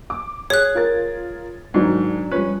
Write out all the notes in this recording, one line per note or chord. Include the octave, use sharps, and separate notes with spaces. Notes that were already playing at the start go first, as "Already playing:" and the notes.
D6
G#4 C#5 F#6 G#6
F4 A#4 A6
G#2 D#3 F#3 D4
F3 G3 C#4 B4